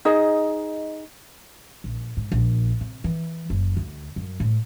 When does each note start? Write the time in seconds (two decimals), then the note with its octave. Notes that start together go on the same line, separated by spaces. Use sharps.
0.05 D#4 G#4 D#5
1.84 A#1
2.17 G#2
2.32 A#1
2.81 C3
3.04 E3
3.50 F#1
3.77 D2
4.16 F#2
4.40 A2